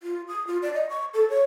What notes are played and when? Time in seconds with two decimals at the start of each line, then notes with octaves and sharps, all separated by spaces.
0.03 F4
0.28 D#6
0.47 F4
0.62 D5
0.74 D#5
0.89 C#6
1.14 A4
1.30 C#5